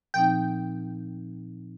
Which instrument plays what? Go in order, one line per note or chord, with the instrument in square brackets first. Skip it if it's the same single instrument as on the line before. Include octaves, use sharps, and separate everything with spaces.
[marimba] A#2 F3 C4 D#4 [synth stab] G5